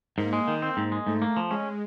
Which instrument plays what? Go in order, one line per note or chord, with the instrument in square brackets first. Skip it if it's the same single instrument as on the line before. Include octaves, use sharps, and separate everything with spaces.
[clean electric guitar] G#2 [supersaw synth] A#3
[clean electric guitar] G#3
D#3
C4
G#2
G#3
[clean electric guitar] G#2 [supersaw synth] A3
[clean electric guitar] A#3
F3
[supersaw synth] G#3 [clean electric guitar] C#4